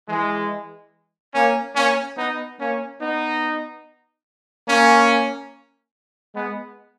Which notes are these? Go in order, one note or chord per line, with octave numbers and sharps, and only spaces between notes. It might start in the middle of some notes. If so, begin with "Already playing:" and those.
E3 G#3
A#3 C#4
A#3 C#4
B3 D#4
A#3 C#4
B3 D#4
A#3 C#4
G#3 B3